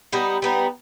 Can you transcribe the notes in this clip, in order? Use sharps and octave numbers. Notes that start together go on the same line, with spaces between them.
G3 B3 D#4
G3 B3 D#4